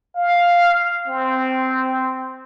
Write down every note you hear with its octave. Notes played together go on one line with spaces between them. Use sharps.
F5
C4